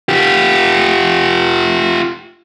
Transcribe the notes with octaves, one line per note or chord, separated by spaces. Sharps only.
F4 G4